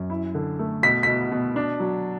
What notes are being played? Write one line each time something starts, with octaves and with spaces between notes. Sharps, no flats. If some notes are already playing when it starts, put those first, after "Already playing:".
Already playing: F#2
E4
D3
A3
B2 B6
B2 B6
B2
D4
F#3